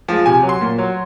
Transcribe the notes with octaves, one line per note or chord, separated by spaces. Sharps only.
F3 G#3
C3 G#5
F#3
C6
A#2
F#3